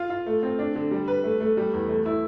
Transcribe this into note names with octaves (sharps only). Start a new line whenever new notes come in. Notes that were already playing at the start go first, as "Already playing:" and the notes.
Already playing: F4
F4
A3
C4
D4
D3
G3
B4
A3
A3
G3
E2
A3
E4